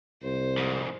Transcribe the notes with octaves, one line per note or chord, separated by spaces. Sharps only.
C2 C5
F2 G#2